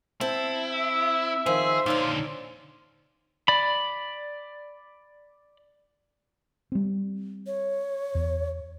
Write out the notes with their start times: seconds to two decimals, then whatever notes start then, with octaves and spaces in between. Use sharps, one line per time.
0.21 C4 E4 A5
0.74 E5
1.46 D#3 F3 G#4 C5
1.86 A#2 D3 D#4 F4 C#5 D5
3.48 D5 B5
6.72 G3 C4
7.47 C#5
8.15 E2